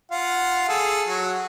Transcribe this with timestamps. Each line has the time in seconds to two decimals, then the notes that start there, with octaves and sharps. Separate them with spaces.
0.11 F4 F5 F#5
0.69 G#4 A4
1.08 F#3 F#4